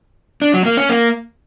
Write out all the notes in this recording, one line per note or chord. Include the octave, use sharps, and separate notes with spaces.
D4
F#3
A#3
C#4
A#3